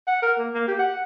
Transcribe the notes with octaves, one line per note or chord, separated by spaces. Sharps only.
F#5
A#4
A#3
A#3
G4
F#5